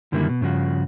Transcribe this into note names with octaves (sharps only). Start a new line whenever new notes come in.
F#2 D3 D#3 G3 A#3 E4
B2
G2 C#3 F3 F#4